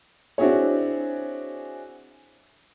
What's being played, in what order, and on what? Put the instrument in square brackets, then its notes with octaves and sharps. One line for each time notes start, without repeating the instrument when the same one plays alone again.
[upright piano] C4 D4 E4 F#4 G#4 C#5